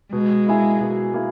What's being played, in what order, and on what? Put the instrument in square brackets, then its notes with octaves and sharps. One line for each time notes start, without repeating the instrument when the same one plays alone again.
[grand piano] B2 [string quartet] G#3
[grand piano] A#3 E4 G#4
B2
A#3 E4 G#4